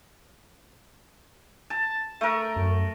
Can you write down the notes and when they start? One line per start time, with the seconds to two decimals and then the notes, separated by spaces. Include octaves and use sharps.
1.70 A5
2.21 A3 A#4
2.56 F#2